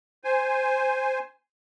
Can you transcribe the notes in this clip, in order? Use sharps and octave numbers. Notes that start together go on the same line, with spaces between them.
C5 G#5